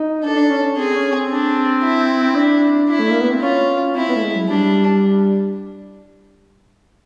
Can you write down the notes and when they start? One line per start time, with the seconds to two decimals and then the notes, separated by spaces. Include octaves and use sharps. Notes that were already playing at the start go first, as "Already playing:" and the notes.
Already playing: D#4
0.23 D4 A4
0.36 D4
0.50 C#4
0.63 C#4
0.77 C4 G#4
0.90 C4
0.94 C#4
1.12 C4
1.30 D4
1.83 E4
2.36 D4
2.89 E4
2.99 A3
3.10 A#3
3.21 B3
3.31 C4
3.42 C#4 F4
3.95 C4 E4
4.08 B3
4.15 A3
4.22 G#3
4.35 F#3
4.48 G3 D4